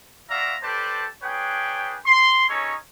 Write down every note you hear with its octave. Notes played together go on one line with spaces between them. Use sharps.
F4 F#4 D5 E5 F5 A#5
G4 A4 B4 C5 D5 A5
D4 G#4 B4 C#5 G5
C6
C#4 D#4 G#4 A4 C#5